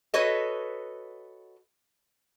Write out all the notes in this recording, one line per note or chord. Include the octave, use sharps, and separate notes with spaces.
F#4 A4 B4 C#5 D#5